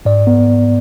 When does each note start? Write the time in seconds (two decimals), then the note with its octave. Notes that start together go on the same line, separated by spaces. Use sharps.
0.05 G#2 D5
0.27 B3